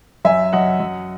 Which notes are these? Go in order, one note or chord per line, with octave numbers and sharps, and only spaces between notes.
F#2 E5 G#5
F#2 D#5 F#5
F#2